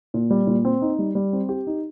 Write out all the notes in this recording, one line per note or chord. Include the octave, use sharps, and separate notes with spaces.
A#2
G3
A#2
C4
D#4
G3
G3
C4
G4
D#4